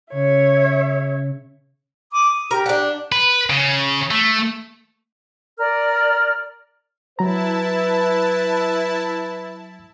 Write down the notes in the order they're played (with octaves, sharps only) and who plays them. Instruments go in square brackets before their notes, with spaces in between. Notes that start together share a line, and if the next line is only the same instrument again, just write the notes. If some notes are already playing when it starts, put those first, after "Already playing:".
[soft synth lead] C#3 [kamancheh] C#5 E5
[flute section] B5 D6 D#6
D#6
[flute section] G4 [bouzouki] A#4
[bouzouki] D4 F#5
[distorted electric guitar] B4
C#3
A3
[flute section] A#4 D5 F6
[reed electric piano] F#3 A#5 [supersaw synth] E4 A5 [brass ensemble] B4